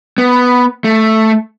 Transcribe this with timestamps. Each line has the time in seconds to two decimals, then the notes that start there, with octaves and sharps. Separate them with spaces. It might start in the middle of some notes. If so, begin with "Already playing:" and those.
0.18 B3
0.84 A3